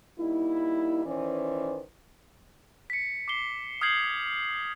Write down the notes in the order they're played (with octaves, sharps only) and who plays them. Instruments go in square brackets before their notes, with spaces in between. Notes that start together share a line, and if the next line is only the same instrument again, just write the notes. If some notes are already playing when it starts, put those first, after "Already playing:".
[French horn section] G3 A#3 D#4 E4
D#3 E3 C#4 B4 C5 D5
[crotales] B6 C#7
D6 C7 G7
D#6 F6 G6 G#6 C7 F#7